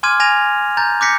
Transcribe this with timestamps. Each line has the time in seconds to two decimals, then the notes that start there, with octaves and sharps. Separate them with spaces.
0.03 G#5 C6 D6 F6 G#6 D#7
0.20 G#5 G#6 A#6 D#7 F7
0.77 A#5 G6 A6
1.01 D6 F#6 G6 A#6 B6 C#7